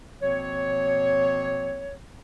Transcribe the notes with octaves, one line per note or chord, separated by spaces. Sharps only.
B2 F3 A#3 C4 C#5